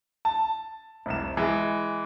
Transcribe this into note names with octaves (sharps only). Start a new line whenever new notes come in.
A5
F1 C2 E7
E3 G#3